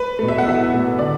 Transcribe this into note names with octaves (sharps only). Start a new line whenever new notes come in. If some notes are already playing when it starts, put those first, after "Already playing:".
Already playing: B4
B2 A3
E5
F#5
E2 E5
B2 A3
D3 D5